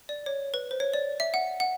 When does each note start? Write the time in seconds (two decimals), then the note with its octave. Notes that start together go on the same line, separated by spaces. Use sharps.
0.09 D5
0.26 C#5
0.54 B4
0.71 C5
0.80 C#5
0.94 D5
1.20 E5
1.34 F#5
1.60 F#5